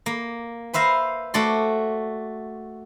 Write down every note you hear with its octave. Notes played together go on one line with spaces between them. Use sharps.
A#3
B4 C5 E5 F5 A#5
A3 F#4 D5 C6